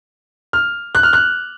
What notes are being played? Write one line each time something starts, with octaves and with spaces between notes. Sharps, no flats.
F6
F#6
F6
F#6